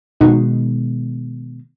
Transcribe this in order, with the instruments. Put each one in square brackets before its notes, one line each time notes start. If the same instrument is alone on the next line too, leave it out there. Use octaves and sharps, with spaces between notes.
[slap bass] B2 D#3 G#3 [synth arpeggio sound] D#4 F#4